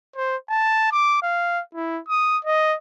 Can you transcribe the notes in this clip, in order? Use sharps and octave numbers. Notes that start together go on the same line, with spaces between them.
C5
A5
D6
F5
E4
D#6
D#5